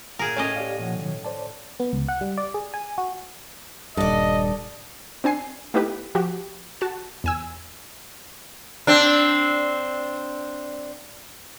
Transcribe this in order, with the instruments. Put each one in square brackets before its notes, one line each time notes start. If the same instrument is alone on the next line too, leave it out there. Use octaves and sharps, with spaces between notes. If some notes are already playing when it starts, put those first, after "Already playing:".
[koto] A#2 G#4 A#4
[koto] A2 C#4 D#5 [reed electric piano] C#5
[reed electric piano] G4 D5 F5
A#2 F3 F#5
B2 D#3 F#3
C5 D5 A5
[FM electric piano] B3
C#2
F#5
G3
D5
G#4
G#5
F#4
[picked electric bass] D#1 G2 [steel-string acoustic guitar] A4 D5 [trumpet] D#5
[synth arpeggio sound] C4 D4 G#5 C7
A3 B3 D#4 E4 G4 B4
F3 F#4 G4
F#4 A5
E2 G#5 E6
[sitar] C4 D4